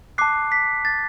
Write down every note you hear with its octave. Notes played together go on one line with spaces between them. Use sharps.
A5 D6 F#6 C7
B6
A6